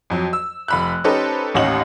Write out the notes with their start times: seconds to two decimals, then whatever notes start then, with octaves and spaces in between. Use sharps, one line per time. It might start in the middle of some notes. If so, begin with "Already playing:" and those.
0.10 F2 F#3
0.33 E6
0.68 F1 B5 F#6
1.04 C#4 D#4 G4 A4 B4 C5
1.54 A1 D#2 C#4 D#5 F#5 F#7